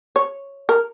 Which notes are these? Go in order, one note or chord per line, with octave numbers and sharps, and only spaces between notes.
C#5
A#4